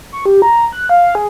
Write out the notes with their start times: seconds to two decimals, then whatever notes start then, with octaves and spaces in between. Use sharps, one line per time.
0.12 C#6
0.26 G4
0.42 A#5
0.73 F#6
0.89 F5
1.15 G#4